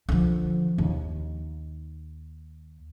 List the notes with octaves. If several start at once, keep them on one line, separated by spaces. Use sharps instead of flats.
D3 F3
D#2